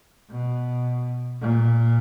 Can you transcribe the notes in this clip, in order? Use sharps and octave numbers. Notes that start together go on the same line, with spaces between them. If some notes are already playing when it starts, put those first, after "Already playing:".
B2
A#2